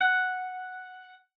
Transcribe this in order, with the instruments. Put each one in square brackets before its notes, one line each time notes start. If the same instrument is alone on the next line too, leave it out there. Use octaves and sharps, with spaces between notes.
[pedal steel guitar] F#5